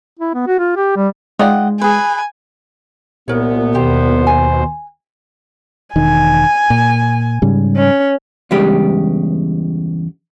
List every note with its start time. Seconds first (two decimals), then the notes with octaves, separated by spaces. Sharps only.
0.19 E4
0.34 B3
0.47 F#4
0.59 F4
0.77 G4
0.96 G3
1.39 G#3 D#4 F4 D5 D#5 F#5 G5
1.82 G#4 B4 G#5
3.28 C2 A#2 B3 A#4 C#5
3.75 D#2 B2 G4 C5
4.27 G#5
5.96 E1 D#3 G#5
6.70 A#2
7.42 G#2 C#3 G3
7.76 C#4
8.51 E2 G2 C#3 G#3 G4 B5